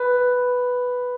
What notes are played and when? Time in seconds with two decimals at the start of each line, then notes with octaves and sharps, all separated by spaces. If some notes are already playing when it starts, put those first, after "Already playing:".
Already playing: B4